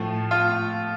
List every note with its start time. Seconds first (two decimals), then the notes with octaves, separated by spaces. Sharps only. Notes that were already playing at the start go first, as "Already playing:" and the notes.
Already playing: A2 F3 A3
0.31 F4